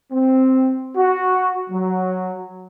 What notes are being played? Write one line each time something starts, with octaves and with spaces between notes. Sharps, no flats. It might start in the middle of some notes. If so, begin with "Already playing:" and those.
C4
F#4
F#3